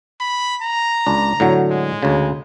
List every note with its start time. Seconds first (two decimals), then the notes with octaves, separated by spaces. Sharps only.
0.20 B5
0.62 A#5
1.07 C#2 D4
1.40 A2 D3 F#3
1.71 G#3
2.02 D2 C#3